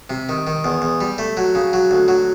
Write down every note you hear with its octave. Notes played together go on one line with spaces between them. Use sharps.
C3
D#3
D#3
E2
E2
G3
A3
F#3
C#3
F#3
D2
F#3